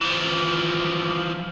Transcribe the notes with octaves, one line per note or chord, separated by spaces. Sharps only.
E3 F3